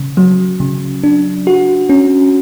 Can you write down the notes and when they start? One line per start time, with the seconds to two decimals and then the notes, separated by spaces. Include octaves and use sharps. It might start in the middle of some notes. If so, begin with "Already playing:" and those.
Already playing: C#3
0.17 F#3
0.60 C#3
1.03 D4
1.47 F#4
1.89 C#4